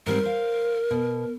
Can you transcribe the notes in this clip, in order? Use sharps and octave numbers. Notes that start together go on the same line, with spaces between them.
G#2 G3 C4 A#4
C5 F5
B2